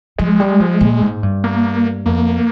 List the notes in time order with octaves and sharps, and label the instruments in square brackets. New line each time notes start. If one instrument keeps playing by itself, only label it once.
[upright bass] F3 [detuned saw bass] G#3
[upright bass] G3
F3
A#2
G#2
G2
[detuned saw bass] A#3
[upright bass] F2 [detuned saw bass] A#3